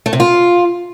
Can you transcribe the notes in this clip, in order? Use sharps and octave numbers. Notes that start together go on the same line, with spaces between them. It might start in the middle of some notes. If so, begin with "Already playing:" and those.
A3
C3
F4